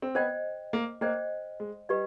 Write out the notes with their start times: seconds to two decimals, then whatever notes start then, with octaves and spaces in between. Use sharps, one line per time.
0.02 C4
0.15 B3 C5 D#5 G5
0.73 A#3
1.01 A#3 C5 D#5 G5
1.60 G#3
1.89 G3 G4 B4 D#5